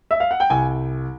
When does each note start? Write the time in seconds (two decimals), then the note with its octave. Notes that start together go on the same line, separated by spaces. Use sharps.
0.11 E5
0.20 F5
0.31 F#5
0.40 G5
0.50 C2 G#5